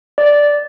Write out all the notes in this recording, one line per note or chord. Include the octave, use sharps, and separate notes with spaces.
D5